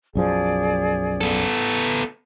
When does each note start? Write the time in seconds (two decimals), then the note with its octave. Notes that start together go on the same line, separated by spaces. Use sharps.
0.15 B1 F#2 F3 G#4 D5
1.21 B3 A4